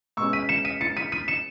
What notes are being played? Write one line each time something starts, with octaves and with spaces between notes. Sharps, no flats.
B2 G#3 C#4 C#6 E6
B6 D#7
C#7 E7
B6 D#7
A6 C#7
B6 D#7
B6 D#7
C#7 E7